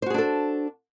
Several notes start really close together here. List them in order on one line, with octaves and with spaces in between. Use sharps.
C5 F#4 G#4 D4 A4